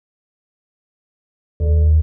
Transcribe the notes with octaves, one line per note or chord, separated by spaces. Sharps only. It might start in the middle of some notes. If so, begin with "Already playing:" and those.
D#2